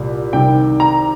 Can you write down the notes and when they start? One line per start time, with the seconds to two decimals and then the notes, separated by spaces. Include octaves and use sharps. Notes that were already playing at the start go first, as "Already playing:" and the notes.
Already playing: C2 A#2
0.33 C2 C3 D#3 G5
0.80 A#5